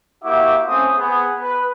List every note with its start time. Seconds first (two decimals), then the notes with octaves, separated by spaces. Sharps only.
0.24 A#3 E4 F#4 G4 E5 D6
0.67 A3 C4 C#4 C5 C6 D#6
0.97 B3 G#4
1.42 B4